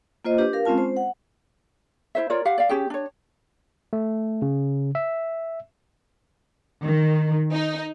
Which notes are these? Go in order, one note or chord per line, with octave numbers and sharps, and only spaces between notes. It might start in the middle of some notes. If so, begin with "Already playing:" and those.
A#3 F4 C5 D#5
D4 G4 B4
A#4 F5
G#3 C4 C#4 F4 A5
C5
F#5
E4 C5 E5
F4 A#4 C#5 D5
G4 F5 F#5
D5 F5
C#4 G4 G#4 G5
D4 C#5
A3
C#3
E5
D#3
D#4